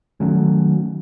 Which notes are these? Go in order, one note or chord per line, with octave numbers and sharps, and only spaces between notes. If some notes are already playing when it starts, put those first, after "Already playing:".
D#3 F#3 A3 C#4